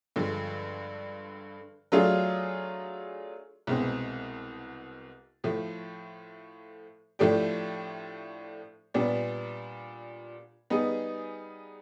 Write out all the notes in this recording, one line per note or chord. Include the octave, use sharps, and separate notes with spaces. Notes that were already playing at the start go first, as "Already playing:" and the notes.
G2 D3 F3 G#3
F#3 A3 D4 F4 G#4
C2 B2 G#3 C4
A2 F3 A3
A2 F3 A3 D4 G4
A#2 G3 B3 D4
G3 B3 D#4 G#4